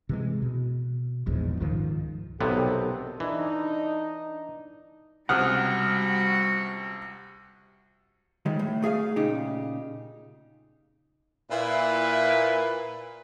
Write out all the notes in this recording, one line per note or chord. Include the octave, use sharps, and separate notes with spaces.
C3 E3 G#3
B2
E1 A#1 E2 G#2
C#2 G#2 D#3 F3
B1 C3 D#3 B3 C4 G4 A4
E3 D4 D#4
C#2 C3 G3 F#4 F#5 D#6 F6
D#3 G3 G#3
A2
A3 G#4 E5 F5
A#2 C#3 D#4 G4
A#2 E4 B4